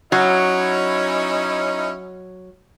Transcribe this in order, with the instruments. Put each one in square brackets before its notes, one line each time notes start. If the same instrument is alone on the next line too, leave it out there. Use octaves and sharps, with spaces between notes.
[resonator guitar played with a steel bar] F#3 [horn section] C#4 D#4 E4